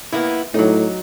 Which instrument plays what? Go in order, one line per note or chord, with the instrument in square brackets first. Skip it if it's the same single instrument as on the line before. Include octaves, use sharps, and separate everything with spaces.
[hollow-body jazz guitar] A#3 B3 E4
[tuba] A2 [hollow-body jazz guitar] F#3 D#4